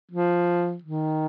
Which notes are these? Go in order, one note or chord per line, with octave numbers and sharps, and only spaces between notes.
F3
D#3